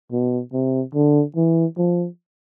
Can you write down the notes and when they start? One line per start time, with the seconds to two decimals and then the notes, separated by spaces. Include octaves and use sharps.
0.12 B2
0.53 C3
0.94 D3
1.36 E3
1.78 F3